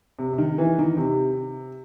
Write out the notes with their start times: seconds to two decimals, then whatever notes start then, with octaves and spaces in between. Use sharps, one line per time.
0.19 C3
0.33 C3
0.38 D#3
0.58 E3
0.78 D#3
0.97 C3